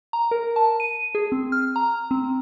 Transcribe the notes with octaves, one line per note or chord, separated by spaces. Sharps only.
A#5
A#4
A5
D#7
G#4
C4
F6
A#5
C4